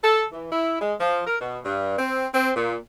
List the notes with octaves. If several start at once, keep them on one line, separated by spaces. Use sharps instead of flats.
A4
E3
E4
G#3
F3
A#4
B2
G2
C4
C4
A#2